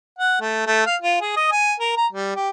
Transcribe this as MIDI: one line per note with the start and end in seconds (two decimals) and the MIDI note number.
0.19 0.40 78
0.41 0.64 57
0.67 0.84 57
0.86 0.96 77
1.02 1.17 65
1.21 1.32 68
1.36 1.51 75
1.52 1.75 80
1.80 1.96 70
1.97 2.07 82
2.12 2.33 55
2.35 2.50 67